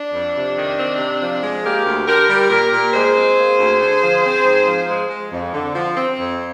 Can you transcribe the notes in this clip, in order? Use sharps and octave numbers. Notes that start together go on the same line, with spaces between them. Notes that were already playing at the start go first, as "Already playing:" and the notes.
Already playing: D4
F2
C3
D#3
C4
C3
F3
G#3
A#3 G4 A#4
D2
D3 G4 A#4
G3
A#2 G4 A#4
A#2
G#3 G#4 C5
C4
A#3
D2
D3
F3
C4
G#2
F3
G#3
G#3
F2
D3
F3
C4
F2